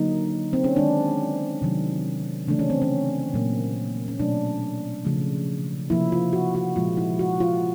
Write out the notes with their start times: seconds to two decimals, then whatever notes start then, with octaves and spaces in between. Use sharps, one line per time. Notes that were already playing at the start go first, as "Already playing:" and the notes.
Already playing: D3 F#3 A#3 D#4
0.53 C4
0.64 C#4
0.76 D#3 G#3 D4
1.62 C3 D#3 F#3 A3
2.48 C#3 E3 A3 D4
2.59 C#4
2.70 C4
2.82 C#4
3.34 A#2 F#3 A#3
4.08 C#4
4.19 B2 F#3 A3 D4
5.05 C#3 F3 A3
5.90 C3 F3 A#3 E4
6.12 F4
6.33 F#4
6.55 F#4
6.76 A#2 F3 G#3 F4
6.97 E4
7.19 F#4
7.40 F4